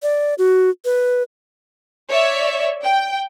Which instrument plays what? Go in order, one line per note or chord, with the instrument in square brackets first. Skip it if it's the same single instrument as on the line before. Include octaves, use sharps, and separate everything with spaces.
[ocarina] D5
F#4
B4
[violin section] C#5 D5 E5
G5